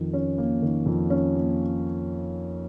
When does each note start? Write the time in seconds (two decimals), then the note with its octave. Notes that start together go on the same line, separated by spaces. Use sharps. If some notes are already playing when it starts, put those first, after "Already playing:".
Already playing: F2 D#3
0.13 C#4
0.38 A#3
0.62 D#3
0.86 F2
1.10 C#4
1.35 A#3